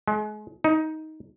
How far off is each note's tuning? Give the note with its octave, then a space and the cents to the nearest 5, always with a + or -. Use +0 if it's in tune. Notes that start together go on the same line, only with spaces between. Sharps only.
G#3 +35
D#4 +15